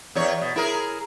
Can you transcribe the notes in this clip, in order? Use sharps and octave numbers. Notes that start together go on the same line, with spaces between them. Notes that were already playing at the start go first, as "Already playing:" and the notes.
E2 C#5
B2
E4 G#4 A#4